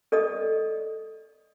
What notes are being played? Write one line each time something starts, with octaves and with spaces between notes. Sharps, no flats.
A4 D5 D#5 D#6